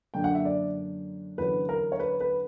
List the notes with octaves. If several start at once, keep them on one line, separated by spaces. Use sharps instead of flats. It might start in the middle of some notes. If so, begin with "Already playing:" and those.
F#2 D3 A#3 D4 G5
F#5
E5
D5
E2 D3 F#3 C#4 B4
A#4
C#5
B4
B4